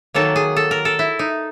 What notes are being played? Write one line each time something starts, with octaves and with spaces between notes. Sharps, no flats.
D#3 F#3 A#3 A4
G#4
A4
A#4
A4
E4
D#4